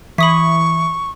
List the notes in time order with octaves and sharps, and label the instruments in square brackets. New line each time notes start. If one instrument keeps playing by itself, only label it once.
[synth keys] E3 [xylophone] B5 D#6 B6 [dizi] C#6